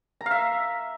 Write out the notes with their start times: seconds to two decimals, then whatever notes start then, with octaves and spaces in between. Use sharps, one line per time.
0.21 A#5
0.26 F5
0.31 E5